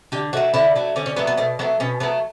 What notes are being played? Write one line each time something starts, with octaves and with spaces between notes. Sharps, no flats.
D3 G4
F#3 A3 F#4
D3 E4
F#3 A3
D3 C#4
C#4
F#3 A3 B3
B3
B2 A3
F#3 A3 B3
B2 C#4
F#3 A3 B3